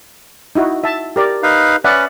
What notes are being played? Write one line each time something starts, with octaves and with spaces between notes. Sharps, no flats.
D#4 E4 F#4
E5 A5
G4 A#4 D5
D#4 B4 F5
C#4 B4 D5 E5 F#5